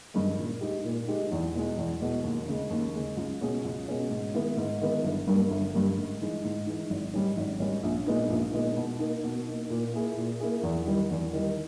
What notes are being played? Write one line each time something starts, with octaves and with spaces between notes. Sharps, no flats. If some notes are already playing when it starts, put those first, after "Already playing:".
G2 D#3 G#3
A#2
G#3 D#4 G4
A#2
G#3 D#4 G4
E2
B2 G#3
E2
B2 G#3
D#2
C#3 G#3
D#2
C#3 G#3
C#2
B2 G#3 C#4 G#4
C#2
B2 G#3 C#4 G#4
G#2
D#3 G#3 B3 E4
G#2
D#3 G#3 B3 E4
G1
G2 G3 A#3
G1
G2 G3 A#3
G#2
E3 G#3 D#4
G#2
E3 G#3 D#4
G#1
G#2 G3 C#4
G#1
G#2 G3 C#4
A#1
A#2 G#3 B3 D#4
A#1
A#2 G#3 B3 D#4
B2
A#3 D#4
B2
A#3 D#4
A#2
A#3 E4 G#4
A#2
A#3 E4 G#4
E2
D#3 G3
E2
D#3 G3